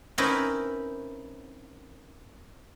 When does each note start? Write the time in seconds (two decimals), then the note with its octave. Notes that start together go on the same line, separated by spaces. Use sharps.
0.18 C4 C#4 D#4 E4 A#4 B4